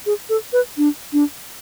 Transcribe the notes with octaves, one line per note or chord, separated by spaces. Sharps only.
G#4
A4
B4
D4
D4